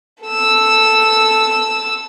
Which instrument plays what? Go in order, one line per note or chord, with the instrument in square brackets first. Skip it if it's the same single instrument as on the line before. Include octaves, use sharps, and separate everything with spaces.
[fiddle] A4 E6